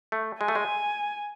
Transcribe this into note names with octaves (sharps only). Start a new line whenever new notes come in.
A3
G#3 G#5
A3
G#3